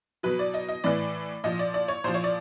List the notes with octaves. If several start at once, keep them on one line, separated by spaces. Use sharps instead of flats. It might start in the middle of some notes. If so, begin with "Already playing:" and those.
B2 F#3 B4
D5
D#5
D#5
A2 E3 D5
A#2 F3 D#5
D5
D5
C#5
A#2 F3 C5
C#5
D5